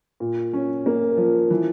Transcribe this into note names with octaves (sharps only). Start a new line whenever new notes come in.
A#2
C#4
A#3
F3
E3